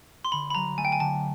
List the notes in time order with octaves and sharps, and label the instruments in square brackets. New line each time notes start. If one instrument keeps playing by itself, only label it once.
[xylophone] C6
[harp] D3 [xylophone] B5
[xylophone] B5
[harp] F#3 [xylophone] A#5
[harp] A3 [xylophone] G#5
[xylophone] G5
G#5
[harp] D3 [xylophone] A5